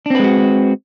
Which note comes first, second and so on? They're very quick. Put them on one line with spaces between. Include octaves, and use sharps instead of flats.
D4 C4 B4 G#3 F#4